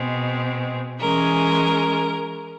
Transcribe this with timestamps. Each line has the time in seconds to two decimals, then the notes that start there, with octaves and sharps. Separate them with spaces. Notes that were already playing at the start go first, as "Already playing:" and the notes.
Already playing: B2 G#3 C4
1.00 E3 G#3 C#4 A#4